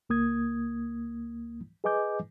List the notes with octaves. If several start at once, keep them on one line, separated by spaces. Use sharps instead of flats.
C#2 A#3 D#6 G#6
G#4 B4 D#5 G#5 D6 G6